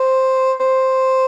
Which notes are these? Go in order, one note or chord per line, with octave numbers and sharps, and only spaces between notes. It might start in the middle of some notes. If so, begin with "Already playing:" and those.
Already playing: C5
C5